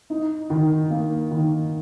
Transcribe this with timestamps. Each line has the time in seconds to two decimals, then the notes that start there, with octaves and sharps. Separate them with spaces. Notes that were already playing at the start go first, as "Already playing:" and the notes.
0.10 D#4
0.50 D#3
0.90 A#3
1.31 D#3